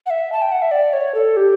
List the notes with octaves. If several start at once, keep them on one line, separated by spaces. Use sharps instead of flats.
F#5
E5
A5
G5
F#5
E5
D5
C#5
A4
G4